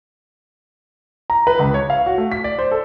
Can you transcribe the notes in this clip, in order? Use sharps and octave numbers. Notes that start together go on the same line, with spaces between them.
A#5
B4
C#2
C#5
F5
F#4
A3
B6
D5
C5
A4